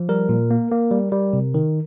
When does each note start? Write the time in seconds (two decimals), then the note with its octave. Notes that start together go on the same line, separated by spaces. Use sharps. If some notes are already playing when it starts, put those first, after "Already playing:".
Already playing: F3
0.09 G3 A#4
0.29 A#2
0.51 A#3
0.71 A#3
0.91 G3
1.12 G3
1.33 C3
1.54 D#3